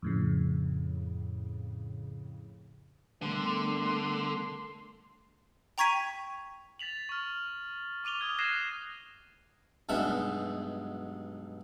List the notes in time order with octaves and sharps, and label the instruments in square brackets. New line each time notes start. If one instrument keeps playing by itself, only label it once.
[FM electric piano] F2 A2 C#3
[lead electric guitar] D3 [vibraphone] G3 B3 A#4 [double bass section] A3 [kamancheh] C6
[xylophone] G5 A#5 C#6 G#6 B6 D#7
[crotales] A6 B6 F7 F#7
C#6 F6
C#6 D6 D#7 F7 G7
D#6 F6 G#6
F#6 G#6 A#6 C7 D#7 E7
[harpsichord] B1 G2 B2 G#3 E5